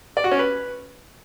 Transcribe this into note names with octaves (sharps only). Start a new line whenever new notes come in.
D5
F#4
C#4
B4